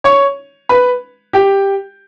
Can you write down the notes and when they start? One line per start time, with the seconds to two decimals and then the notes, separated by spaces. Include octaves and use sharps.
0.04 C#5 C#6
0.69 B4 B5
1.33 G4 G5